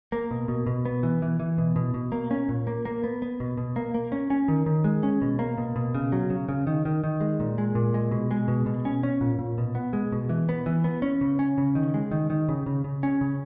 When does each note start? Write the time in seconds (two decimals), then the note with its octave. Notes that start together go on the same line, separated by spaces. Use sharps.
0.12 A#3
0.31 B2
0.48 B2
0.67 B2
0.85 B3
1.03 E3
1.22 E3
1.40 E3
1.58 B2
1.76 B2
1.94 B2
2.12 A#3
2.31 C#4
2.49 A#2
2.67 A#3
2.85 A#3
3.04 B3
3.22 B3
3.40 B2
3.57 B2
3.76 A#3
3.94 A#3
4.12 C#4
4.30 C#4
4.48 D#3
4.66 D#3
4.84 G#3
5.03 C#4
5.22 B2
5.39 A#3
5.58 B2
5.76 B2
5.95 C#3
6.12 F#3
6.30 C#3
6.49 C#3
6.67 D#3
6.85 D#3
7.04 D#3
7.21 G#3
7.40 A#2
7.58 G#3
7.75 A#2
7.94 G#3
8.11 B2
8.31 G#3
8.48 B2
8.66 B2
8.85 C#4
9.03 C#4
9.21 A#2
9.39 A#2
9.58 B2
9.75 B3
9.93 G#3
10.12 B2
10.29 E3
10.49 B3
10.66 E3
10.84 B3
11.02 C#4
11.21 C#3
11.39 C#4
11.58 C#3
11.75 D#3
11.94 G#3
12.11 D#3
12.30 D#3
12.49 C#3
12.66 C#3
12.84 C#3
13.03 C#4
13.21 C#3